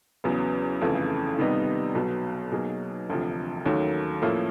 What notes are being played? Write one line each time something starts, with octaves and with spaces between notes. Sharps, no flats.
E2 C#3 F#3 B3
G1 F2 C#3 E3 A3
C3 D#3 G3 B3 D#4
B1 B2 F#3
B2 F#3 A#3 D#4 G#4
E1 D2 C3 F3
D#2 D#3 F#3 A3 C#4
A2 F3 A#3 C#4 E4